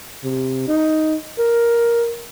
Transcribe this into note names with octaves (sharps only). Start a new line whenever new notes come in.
C3
D#4
A#4